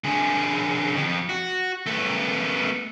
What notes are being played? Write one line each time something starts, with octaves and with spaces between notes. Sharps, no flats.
D3 G#4
F2
F#4
A3 B3